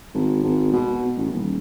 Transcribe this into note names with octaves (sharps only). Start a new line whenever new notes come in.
G#1
G#1
B2
A1
D#1